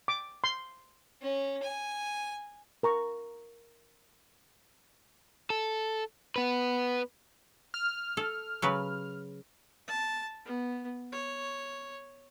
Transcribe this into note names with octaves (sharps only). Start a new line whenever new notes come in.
D6
C6
C#4
G#5
A#4 A#5 C#6
A4
B3 B4
F6
A4
C#3 F#3 B4
A5
B3
C#5